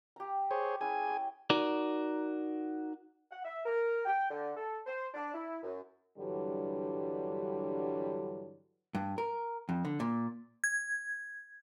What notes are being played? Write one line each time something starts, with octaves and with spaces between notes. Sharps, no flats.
G4 A#5
G#4 C5 C#5
C#4 E4 G#4 B4 G#5
G5 D6
D#4 F#4 A#4 D5
F#5
E5
A#4
G5
D3
A4
C5
D4
E4
F#2
G2 D3 E3 F#3 G3
G2
A#4
F2
D3
A#2
G#6